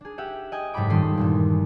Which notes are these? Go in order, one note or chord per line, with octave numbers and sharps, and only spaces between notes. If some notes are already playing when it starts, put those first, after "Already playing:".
D4 G#4
G4 E5 F#5
D#5 G5 G#5
F#1 G#2 G4 A4 B5 D6
D#1 G2 D#3 A4 C6 D#6
E2 G2 A#2